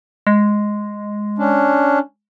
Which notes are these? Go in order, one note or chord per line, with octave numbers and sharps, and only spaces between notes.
G#3
C#4 D4